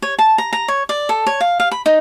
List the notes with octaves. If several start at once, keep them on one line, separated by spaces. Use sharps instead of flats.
C#5
A5
A#5
A#5
C#5
D5
A4
C#5
F5
F5
B5
D#4